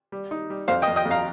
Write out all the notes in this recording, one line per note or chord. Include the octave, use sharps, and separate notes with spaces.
G3
D#4
G3
F2 C5 F5
D#5 G5
F2
D#5 G5
F2
F5 A#5